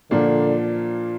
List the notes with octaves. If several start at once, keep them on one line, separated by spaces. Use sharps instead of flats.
A#2 D3 F3 A#3 D4